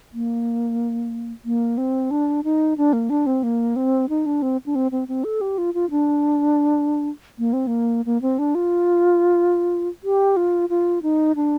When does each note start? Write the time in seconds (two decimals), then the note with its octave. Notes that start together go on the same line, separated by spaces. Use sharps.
0.13 A#3
1.45 A#3
1.78 C4
2.11 D4
2.44 D#4
2.78 D4
2.93 A#3
3.10 D4
3.26 C4
3.43 A#3
3.76 C4
4.09 D#4
4.26 D4
4.42 C4
4.66 D4
4.75 C4
4.92 C4
5.08 C4
5.24 A4
5.41 G4
5.58 F4
5.74 F4
5.90 D4
7.39 A#3
7.53 C4
7.67 A#3
8.06 A#3
8.22 C4
8.39 D4
8.55 F4
10.04 G4
10.37 F4
10.69 F4
11.03 D#4
11.36 D4